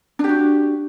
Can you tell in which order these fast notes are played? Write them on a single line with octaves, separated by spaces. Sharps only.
D4 G4 F#4